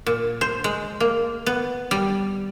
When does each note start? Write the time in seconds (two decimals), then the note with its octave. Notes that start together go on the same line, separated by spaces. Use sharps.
0.06 A#2
0.41 C5
0.64 G#3
1.00 A#3
1.46 B3
1.91 G3